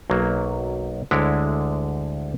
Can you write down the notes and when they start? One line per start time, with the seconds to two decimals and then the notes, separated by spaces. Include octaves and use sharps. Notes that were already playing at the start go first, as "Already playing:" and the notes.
0.10 B1 F#3 A#3
1.11 D2 D3 G#3 E4 C#5 D5